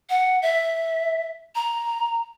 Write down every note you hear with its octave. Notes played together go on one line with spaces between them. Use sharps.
F#5
E5
A#5